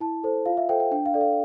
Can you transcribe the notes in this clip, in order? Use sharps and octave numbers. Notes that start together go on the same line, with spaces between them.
E4 A5
A4 C5
F4 F5
E5
A4 C5 G5
G5
D4 G5
F5
A4 D5
F5